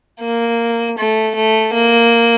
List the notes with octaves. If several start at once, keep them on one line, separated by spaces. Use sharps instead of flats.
A#3
A3
A3
A#3